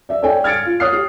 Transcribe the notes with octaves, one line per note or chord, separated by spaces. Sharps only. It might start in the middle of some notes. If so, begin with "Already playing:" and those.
D5 E5
A4 C#5 D5 G5 G#5
F6 G#6 A6 C#7 D7
F4
C#5 D#6 F6 F#6 C7
G4